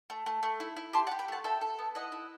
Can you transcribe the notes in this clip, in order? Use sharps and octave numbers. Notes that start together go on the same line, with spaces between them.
A3
A3
A3
E4
E4
G4 A5 C6
F#5 A5
G4
G5 B5
A3 F#5 A5
A4 E5 G5
A4
B3
E4 D#5 F#5
E4